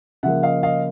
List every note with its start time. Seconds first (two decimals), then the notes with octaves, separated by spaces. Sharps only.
0.23 C#3 F3 A#3 E5 F#5
0.43 D#5 F5
0.63 D#5 F5